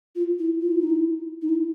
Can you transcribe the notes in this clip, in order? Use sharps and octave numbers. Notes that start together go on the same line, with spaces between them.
F4
E4
F4
E4
D#4
E4
D#4
E4